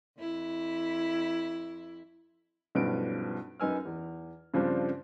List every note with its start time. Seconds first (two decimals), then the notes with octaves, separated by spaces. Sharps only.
0.19 F2 E4
2.75 B1 G2 F3 B3 C#4 D7
3.60 F#2 D#4 B4 G#5 E6 F6
3.85 E2
4.54 G2 C#3 F3 C4 D4